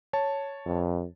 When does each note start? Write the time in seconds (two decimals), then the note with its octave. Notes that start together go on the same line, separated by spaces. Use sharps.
0.13 C#5 A5
0.66 F2